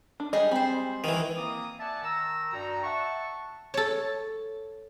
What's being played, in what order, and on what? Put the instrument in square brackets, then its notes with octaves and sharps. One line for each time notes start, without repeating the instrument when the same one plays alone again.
[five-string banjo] D4
[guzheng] G3 G#3 G#4 [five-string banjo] D#5
[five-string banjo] C4 [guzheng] C5 B5
[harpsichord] D#3 E3
[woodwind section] A#3 C4 E4 D6 D#6
D5 E5 F#5 G#5 A5
D#3 A#5 E6
G2 F#4 D5 G5 A#5
E5 F#5 A5 C#6
[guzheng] A4 C#5